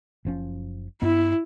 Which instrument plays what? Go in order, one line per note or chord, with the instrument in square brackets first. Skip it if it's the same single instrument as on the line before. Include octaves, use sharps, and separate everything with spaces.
[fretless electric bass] F#1 F3 C#4
[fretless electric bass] G2 B3 [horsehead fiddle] E4